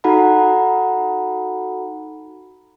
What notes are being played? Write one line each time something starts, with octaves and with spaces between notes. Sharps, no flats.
D#4 F#4 A4 F#5 A#5 B5